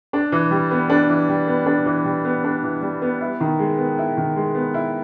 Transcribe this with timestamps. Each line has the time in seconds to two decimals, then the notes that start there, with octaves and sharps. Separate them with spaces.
0.13 D4
0.32 E3
0.51 G3
0.71 B3
0.90 D4
1.09 E3
1.29 G3
1.47 B3
1.66 D4
1.86 E3
2.05 G3
2.25 B3
2.44 D4
2.63 E3
2.82 G3
3.02 B3
3.21 E4
3.40 D#3
3.59 G#3
3.78 B3
3.98 E4
4.17 D#3
4.36 G#3
4.55 B3
4.74 E4